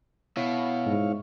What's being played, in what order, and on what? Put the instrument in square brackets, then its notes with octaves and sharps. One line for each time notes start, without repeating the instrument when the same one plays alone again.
[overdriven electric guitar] B2 [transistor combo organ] E4 C#5 F5
[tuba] G#2